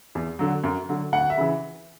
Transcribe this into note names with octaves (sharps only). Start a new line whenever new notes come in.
E2
D3 F#3
F#2
D3 F#3
D2 F#5
E5
C#3 E3